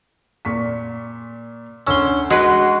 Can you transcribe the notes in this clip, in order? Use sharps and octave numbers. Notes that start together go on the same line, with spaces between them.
A#2 C#6 B6
D2 C#4 C6 E6
G#3 D#4 F#4 B4